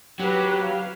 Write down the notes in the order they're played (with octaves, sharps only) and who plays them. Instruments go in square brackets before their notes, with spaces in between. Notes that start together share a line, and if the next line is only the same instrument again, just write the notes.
[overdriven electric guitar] F#3 [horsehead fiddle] G4 B4
[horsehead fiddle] F5